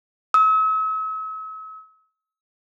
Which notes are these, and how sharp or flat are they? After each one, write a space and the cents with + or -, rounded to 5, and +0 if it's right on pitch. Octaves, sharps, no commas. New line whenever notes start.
E6 -45